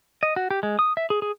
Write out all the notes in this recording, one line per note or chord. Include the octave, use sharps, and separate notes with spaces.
D#5
F#4
G4
G#3
D#6
E5
G#4
G#4